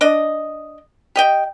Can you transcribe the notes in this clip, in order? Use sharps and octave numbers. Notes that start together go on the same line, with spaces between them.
D4 D#5
G4 D#5 G5